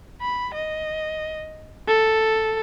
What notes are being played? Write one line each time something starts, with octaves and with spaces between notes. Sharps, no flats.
B5
D#5
A4